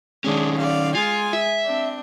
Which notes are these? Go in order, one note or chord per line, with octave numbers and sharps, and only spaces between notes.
D#3 G#3 C#4 D4
D5 F5
G#3 F4 G#5
E5
C4 D4